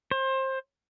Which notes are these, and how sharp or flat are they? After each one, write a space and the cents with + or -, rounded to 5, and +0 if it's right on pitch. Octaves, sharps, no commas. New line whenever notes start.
C5 +25